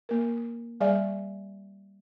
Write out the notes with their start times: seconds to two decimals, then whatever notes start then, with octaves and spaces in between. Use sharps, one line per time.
0.09 A#3 A#4
0.81 G3 G#4 D5 E5 G#5